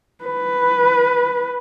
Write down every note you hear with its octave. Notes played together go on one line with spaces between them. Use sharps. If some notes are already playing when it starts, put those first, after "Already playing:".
B4